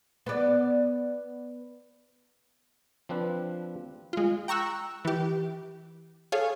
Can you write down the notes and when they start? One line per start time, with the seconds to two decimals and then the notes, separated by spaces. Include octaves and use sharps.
0.26 B3 D5
3.09 F3 C4 D4 B4
4.13 G#3 F4
4.48 G5 A#5 C#6 E6 F#6
5.05 E3 G4
6.32 G#4 A4 C#5 F5